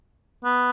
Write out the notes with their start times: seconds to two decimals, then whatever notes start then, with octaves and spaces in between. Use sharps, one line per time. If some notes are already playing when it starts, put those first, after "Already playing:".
0.45 B3